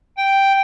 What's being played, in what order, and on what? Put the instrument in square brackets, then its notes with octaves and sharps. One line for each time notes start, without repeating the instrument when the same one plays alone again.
[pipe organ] G5